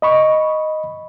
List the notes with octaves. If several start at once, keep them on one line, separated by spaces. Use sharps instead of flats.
D#5 B5 C#6